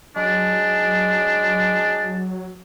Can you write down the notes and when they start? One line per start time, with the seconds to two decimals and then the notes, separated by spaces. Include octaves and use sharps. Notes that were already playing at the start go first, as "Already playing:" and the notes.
0.16 F#3 G#3 D4